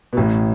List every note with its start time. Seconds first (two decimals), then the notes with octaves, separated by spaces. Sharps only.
0.13 B2
0.17 A1 A2